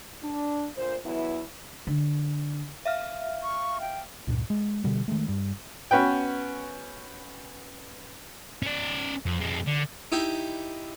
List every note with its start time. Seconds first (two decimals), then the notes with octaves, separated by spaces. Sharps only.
0.23 D4
0.76 A#2 D3 C5
1.05 E2 F#3 B3 E4
1.87 D3
2.85 E5 F5 F6
3.43 C#6
3.81 G5
4.27 C#2 G2 A#2
4.50 G#3
4.84 B2 D3 G3
5.08 D#3 G#3 A3
5.28 G2
5.91 B3 C#4 F#4 B4 G5
8.62 C#4 D5
9.26 F2
9.40 F2 G#3
9.67 D3
10.12 D#4 E4 G4